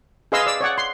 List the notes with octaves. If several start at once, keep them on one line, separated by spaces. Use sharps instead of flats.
G#4 B4 D#5 F5 C6 E6
D5 E6
C#5 D5 F#5
C6